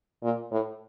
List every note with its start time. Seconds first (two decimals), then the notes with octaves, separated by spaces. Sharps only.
0.23 A#2
0.51 A2